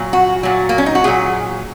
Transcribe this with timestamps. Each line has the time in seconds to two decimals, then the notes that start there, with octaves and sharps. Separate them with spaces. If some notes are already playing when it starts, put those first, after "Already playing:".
Already playing: A#2 F#3
0.13 F#4
0.43 A#2 F#3
0.69 A#3
0.78 C#4
0.86 D#4
0.95 F#4
1.04 A#2 F#3 G#4